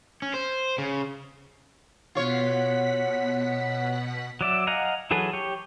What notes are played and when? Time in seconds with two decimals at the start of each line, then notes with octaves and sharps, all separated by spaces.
0.22 C#4
0.34 C5
0.78 C#3
2.15 B2 F4 C#5 F#5 B6
4.41 F#3 D5 E5
4.67 D#5 F5 F#5 G#5 A#5
5.11 E3 F#3 G#4 A4 B4
5.33 G4 C#5